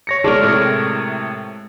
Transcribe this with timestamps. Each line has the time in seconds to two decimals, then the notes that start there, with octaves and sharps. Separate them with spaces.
0.07 C#5 A#6 C#7
0.24 G#3 A#4 C#5 D5 A5
0.42 A2 C3 A3